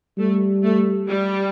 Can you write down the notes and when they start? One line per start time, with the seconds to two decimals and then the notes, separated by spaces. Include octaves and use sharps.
0.18 G3 A3
0.63 A3
1.07 G3